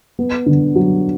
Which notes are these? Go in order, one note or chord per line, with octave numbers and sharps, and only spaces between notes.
B3
D3
F#3